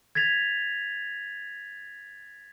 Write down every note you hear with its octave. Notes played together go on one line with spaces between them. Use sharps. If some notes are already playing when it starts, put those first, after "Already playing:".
G#6 A6 B6 F7